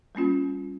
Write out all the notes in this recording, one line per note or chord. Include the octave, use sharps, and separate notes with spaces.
G3 A#3 C#4 F4